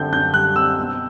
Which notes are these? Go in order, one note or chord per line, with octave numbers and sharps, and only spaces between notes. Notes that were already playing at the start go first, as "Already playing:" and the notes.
Already playing: F#2 D3 G3 C4 G6
F#2 G6
G3 F#6
C4 E6
B2